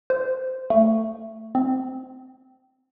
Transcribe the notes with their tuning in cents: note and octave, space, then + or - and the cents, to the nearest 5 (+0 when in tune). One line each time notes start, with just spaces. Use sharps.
C5 -15
A3 +15
C4 -10